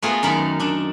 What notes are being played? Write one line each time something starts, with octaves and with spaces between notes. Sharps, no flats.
A3 B3 F4 F#4 G#4 A#4
F#2 D#3 A3 A#4 B5
D#3 D4